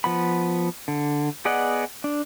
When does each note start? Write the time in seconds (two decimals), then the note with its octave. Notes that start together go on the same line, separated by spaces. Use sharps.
0.04 F3 B3 B5
0.88 D3
1.45 B3 G#4 D5 D#5 F#5
2.04 D4